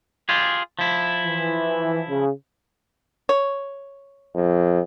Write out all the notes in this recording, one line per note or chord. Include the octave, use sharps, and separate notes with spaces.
F4 G4 G#4
F3 E4
E3
C#3
C#5
F2